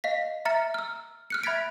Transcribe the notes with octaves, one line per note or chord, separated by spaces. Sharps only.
D#5 F5 B6
E5 A#5 F6 A6 C#7
E6 F6
F6 F#6 C#7
E5 B5 G#6 A6 B6 D7